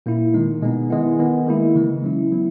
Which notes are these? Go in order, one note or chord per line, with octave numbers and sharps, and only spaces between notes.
A#2 A#3 E4
D#3 G#3 D#4
B2 G#3 B3 D#4
D#3 G#3 B3 E4
D#3 G#3 B3
D#3 A#3 E4
C#3 E3 G#3
F#3 C#4 E4
F#3 B3 E4